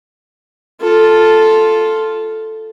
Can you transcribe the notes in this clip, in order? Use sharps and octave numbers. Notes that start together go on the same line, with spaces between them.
F4 A4